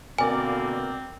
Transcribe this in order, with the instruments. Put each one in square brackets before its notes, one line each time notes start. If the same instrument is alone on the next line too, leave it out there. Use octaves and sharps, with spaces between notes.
[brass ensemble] B2 D3 A#3 [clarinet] C4 [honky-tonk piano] A#4 D5 [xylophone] G#5